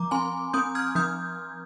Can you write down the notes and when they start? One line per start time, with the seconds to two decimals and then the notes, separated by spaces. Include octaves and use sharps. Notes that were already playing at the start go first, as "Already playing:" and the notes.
Already playing: F3 A#5 D6
0.11 C4 G#5 C6
0.53 C4 D#6 G6
0.75 F6 G#6
0.95 F3 D#6 G6